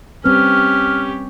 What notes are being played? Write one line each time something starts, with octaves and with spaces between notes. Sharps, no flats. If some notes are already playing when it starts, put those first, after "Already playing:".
G3 C4 C#4 G4 B4 F6